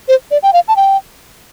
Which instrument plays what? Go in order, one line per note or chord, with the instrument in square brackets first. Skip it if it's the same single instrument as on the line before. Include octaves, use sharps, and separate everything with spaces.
[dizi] C5
D5
G5
F5
A5
G5